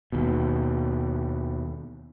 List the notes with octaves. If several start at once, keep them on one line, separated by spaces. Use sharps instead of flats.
D#2 B2